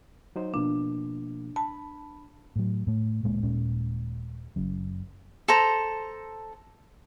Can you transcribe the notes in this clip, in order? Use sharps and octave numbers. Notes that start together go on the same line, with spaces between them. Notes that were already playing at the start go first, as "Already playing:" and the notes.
F#3 D#4 C5
B2 F3 A#3 D4
A5 B5
A2 F#3
A2 A3
D1 A#2 G#3 A#3
D#1 A#2 G#3 C#4
F#1 F#2
A4 C5 A#5